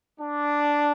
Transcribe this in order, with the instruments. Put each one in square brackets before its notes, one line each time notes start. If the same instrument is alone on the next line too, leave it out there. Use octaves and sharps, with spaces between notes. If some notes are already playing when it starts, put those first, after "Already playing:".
[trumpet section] D4